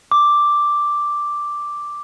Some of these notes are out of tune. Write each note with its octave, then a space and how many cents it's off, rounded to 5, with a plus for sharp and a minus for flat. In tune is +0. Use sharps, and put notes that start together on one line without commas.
D6 +0